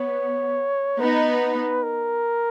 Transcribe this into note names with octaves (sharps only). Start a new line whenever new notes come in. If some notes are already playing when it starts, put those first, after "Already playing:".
Already playing: B3 C#5
B3 D#4 B4
A#4